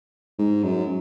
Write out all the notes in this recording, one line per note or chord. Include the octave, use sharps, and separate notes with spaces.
G#2
F#2